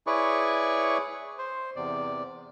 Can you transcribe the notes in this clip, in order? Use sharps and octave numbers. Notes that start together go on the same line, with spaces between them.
E4 G#4 B4 C#5 D5 C#6
C5
E2 C3 D5